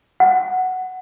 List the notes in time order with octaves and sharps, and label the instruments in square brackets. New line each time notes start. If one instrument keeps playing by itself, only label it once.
[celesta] F#5